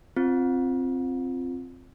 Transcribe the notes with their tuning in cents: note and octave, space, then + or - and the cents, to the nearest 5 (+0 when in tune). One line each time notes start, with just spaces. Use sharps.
C4 +0 F4 +0